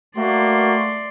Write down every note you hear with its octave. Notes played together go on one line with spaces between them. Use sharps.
A3 A#3 F#4 D5 C6